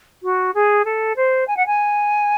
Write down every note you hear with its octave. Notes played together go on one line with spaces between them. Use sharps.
F#4
G#4
A4
C5
G#5
F#5
G#5